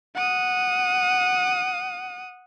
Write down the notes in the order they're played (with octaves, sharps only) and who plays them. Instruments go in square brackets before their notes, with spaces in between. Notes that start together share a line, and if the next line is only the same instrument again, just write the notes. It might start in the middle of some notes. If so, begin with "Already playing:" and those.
[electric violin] F#5 D#6